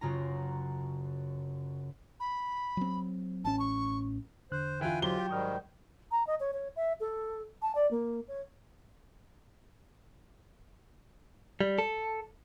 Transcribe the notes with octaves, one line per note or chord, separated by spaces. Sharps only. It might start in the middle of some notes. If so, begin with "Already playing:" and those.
F#1 F#2 C#3 F4 A#5
B5
F#3 C4
A1 C#4 A5
C#6
E2 D3 C5 F#6
E3 F4 G5 G#5
G#2 F#3 F4 G4 G7
G5
G#2 D#3 G3 C#6 D#6 F6
A#5
D#5
C#5
C#5
E5
A4
A5
D5
A#3
C#5
G3
A4